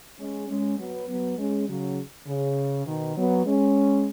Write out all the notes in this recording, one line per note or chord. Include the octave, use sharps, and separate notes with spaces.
G#3 C#4
G#3 C#4
F#3 B3
F#3 B3
G#3 C#4
C#3 F#3
C#3
B2 D#3
F#3 B3
G#3 C#4